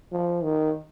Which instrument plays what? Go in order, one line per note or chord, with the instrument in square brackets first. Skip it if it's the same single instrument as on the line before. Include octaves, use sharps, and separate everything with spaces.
[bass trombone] F3
D#3